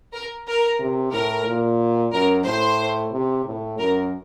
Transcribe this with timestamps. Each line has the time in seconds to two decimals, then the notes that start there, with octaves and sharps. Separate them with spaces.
0.14 A#4
0.47 A#4
0.80 C3
1.12 A2 A#4
1.46 A#2
2.12 F#2 A#4
2.45 A2 C5
3.12 C3
3.45 A2
3.79 F#2 A#4